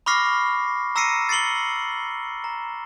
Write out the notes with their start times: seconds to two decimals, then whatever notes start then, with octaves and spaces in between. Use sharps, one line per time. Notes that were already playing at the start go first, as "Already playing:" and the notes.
0.06 B5 C#6 D6 F6 A#6 C7
0.96 A#5 E6 A#6 C7 C#7 D#7
1.29 A6 C7 C#7 F#7 G7
2.44 A#5